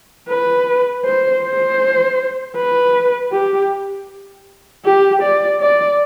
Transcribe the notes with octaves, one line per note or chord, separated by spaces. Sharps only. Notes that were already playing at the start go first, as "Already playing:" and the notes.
B4
C5
C5
B4
G4
G4
D5
D5